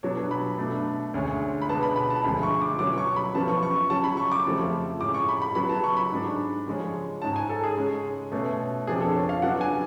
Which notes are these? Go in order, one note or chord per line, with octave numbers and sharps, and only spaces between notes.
B2 F#3 B3 D4 C#5
B5
B2 A3 D4
D2 D3 G#3 C#4
B5
B2 G#3 B3 D4 A5
B5
B5
A5
D2 D3 F3 G#3 B5
C#6
D6
B2 F#3 C#4 D6
C#6
B5
F#2 F3 B3 A5
C#6
C#6
C#6
C#3 F#3 C#4 A5
B5
C#6
D6
F2 C#3 F3 A3
A2 G#3 C#4 D6
C#6
B5
B5
C#3 F#3 B3 B5
A5
C#6
B5
G#2 G#3 D4
C#3 F3 G#3 C#4
G#2 G#3 C#4 A5
G#5
A4
G#4
C#3 G#3 C#4
B2 A3 C#4
F2 C#3 F3 B3 D4 G#4
A4
C#5
F5
C#3 F#3 B3 D4 F#5
G#5